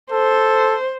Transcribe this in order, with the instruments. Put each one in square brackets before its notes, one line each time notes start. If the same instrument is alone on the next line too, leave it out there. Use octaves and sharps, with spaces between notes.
[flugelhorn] A4 [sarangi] C5